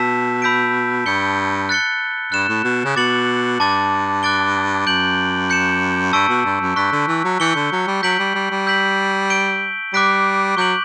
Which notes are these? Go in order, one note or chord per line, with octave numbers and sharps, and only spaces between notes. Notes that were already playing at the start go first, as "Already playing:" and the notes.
Already playing: B2 A5 E6 G6 B6 E7
B5 E6 G6 B6 D7
G2 G6 C#7 G7
F#6 A6 C#7 G7
G2 F#6 C#7 E7
A2
B2
C#3
B2 D6 A6 C#7 F#7
G2 A5 D6 A6
D6 F#6 A6 D7 G7
F#2 G6 D7 F#7
G6 C#7 E7
G2 A5 C#6 E6 B6 D7
B2
G2
F#2
G2 C#6 F#6 B6
D3
E3
F#3
E3 G6 C#7 G7
D3
F#3
G3
F#3 G6 B6 D7 F#7
G3
G3
G3
E6 G6 B6 F#7
G6 D7 G7
G3 D6 F#6 B6 D7
F#3 C#6 G6 D7 F#7